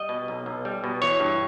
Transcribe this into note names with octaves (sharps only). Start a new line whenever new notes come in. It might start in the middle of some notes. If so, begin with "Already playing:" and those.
Already playing: G3 D#5
B2
B1
B1
G3
B2
E3 C#5
G2